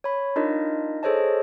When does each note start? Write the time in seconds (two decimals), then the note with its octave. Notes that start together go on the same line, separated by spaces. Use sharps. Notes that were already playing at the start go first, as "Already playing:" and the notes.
0.04 C#5 B5
0.36 D4 D#4 F4 A#4 D#5
1.03 G#4 A4 C5 C#5 D#5 A5